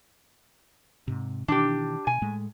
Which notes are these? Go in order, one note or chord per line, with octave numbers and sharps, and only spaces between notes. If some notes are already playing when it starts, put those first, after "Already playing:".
G#2 C3
B2 D#3 E3 D4 G4
B2 G#5
A2 G#3 A3